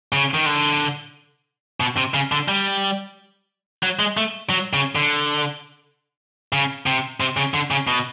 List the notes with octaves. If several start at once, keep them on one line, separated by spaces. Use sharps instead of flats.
C#3
D#3
D3
B2
C3
C#3
D3
G3
F#3
G#3
A3
F#3
C#3
D3
C#3
C3
C3
C#3
D3
C#3
B2